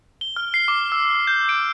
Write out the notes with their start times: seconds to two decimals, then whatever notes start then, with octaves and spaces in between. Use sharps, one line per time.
0.21 G7
0.36 F6
0.54 C7
0.68 D6
0.92 E6
1.27 G6
1.49 D7